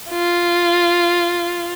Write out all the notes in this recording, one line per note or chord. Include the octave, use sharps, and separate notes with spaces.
F4